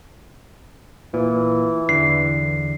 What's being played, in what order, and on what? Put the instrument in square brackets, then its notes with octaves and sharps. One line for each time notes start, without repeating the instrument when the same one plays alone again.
[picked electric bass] A#2 [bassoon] E3
[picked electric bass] E2 D3 [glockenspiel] C7